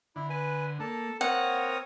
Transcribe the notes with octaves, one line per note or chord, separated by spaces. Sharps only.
D3 E4
B4 G#5
A#3 A4 A5
C4 A#4 C#5 F5 F#5 D#6